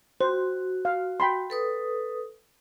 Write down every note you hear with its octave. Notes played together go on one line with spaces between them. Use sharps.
F#4 C5
F5
G5 B5 C6
A4 B4 D#6